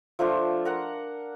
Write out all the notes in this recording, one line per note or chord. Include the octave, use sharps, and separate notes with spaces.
F3 A3 D4 F4
A#4 F#5 A#5